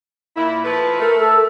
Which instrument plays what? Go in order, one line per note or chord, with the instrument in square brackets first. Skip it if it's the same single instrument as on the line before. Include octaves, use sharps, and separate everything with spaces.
[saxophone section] A#2 E4
F3 A3 B4
[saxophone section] A3 [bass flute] A#4
[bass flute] A4